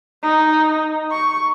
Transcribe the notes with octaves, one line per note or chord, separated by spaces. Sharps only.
D#4
C#6